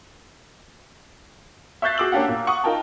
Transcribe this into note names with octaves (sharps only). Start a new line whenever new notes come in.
E5 C#6 F#6 G6 A6 C7
F#4 G#4 D6 E6 F#7
A#3 C#4 D4 G4 F5 F#5
A#2
F#5 C#6 D#6
D#4 F4 A#4 G5 A5